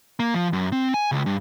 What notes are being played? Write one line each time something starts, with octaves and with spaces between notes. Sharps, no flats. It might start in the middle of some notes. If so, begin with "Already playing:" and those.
A#3
F3
F#2
C4
G#5
C#2
G2